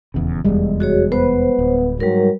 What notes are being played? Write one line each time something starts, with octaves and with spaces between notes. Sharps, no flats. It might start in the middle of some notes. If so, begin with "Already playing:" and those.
D#1 E2 C#3
F1 E2 G3 G#3
F#4 G#4 C#5
B3 B4 C5
D1
G#2 F#3 G3 A#4